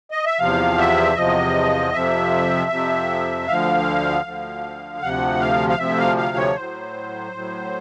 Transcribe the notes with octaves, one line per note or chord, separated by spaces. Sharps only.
D#5
E5
E2 C3 F3 F5
E5
E2 C3 F3 D#5
F2 C3 F3 E5
F2 C3 F3
D2 D3 F3 F5
D2 D3 F3
D2 C3 F3 F#5
F5
F5
D2 C3 F3 E5
F5
F5
C#5
A2 F#3 C5
A2 F#3